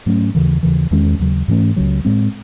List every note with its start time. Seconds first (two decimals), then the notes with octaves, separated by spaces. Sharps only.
0.06 G#2 F#3 A3 C#4
0.35 D#2 C#3 E3
0.63 D#2 C#3 E3
0.91 E2 D#3 G#3 C#4
1.20 D#2 C#3 F#3
1.48 G#2 E3 A3 C#4
1.76 C#2 C#3 F#3
2.05 A2 G#3 C4